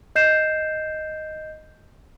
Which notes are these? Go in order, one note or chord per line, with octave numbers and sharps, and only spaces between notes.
D#5 G6 C7 E7